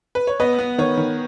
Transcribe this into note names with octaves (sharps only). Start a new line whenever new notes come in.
B4
C#5
B3 B4 D#5
B3
D#3 C#5
D#3